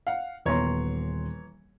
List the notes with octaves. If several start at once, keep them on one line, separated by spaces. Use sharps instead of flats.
F5 F#5
D#1 E3 B3 C#5 A#5 C6